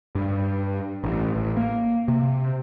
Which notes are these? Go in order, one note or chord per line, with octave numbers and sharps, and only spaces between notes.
G2
A1
A1
A#3
C3